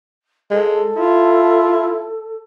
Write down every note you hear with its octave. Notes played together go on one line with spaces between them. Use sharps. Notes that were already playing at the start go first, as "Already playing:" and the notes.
G#3 A4
E4 F4